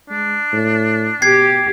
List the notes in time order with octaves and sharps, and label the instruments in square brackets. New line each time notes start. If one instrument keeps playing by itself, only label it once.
[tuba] G#3 [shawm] D4
[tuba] A2
[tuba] B2 [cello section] G4 [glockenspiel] G#6 C7